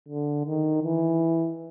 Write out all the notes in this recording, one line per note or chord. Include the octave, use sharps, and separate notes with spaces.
D3
D#3
E3